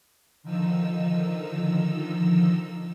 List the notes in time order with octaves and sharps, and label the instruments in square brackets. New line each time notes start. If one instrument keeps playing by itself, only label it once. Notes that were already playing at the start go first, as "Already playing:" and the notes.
[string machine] D3 D#3 F3 D#4 E6